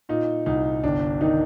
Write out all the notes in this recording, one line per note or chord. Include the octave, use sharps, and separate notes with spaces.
A#2 D#4
C2 D#4
G1 D4
D#3 D#4